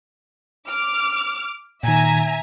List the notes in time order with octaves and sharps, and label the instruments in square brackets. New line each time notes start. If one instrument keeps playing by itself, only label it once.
[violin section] D6 F6
[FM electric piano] A#2 D#3 [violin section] E5 G#5 A#5